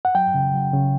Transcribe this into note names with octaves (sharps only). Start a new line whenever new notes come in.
F#5
F#3 G5
C#3
F#3
C#3